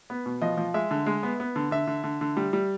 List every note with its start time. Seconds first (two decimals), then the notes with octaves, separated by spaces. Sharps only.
0.10 B3
0.26 B2
0.42 F3 D#5
0.57 F3
0.74 G#3 E5
0.91 D3
1.06 G#3
1.23 B3
1.40 B3
1.56 D3
1.71 D3 E5
1.87 D3
2.04 D3
2.21 D3
2.37 G3
2.53 G3